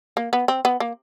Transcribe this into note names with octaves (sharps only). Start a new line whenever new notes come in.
A#3
B3
C4
B3
A#3